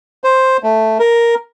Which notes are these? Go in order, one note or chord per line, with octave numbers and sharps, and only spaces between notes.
C5
A3
A#4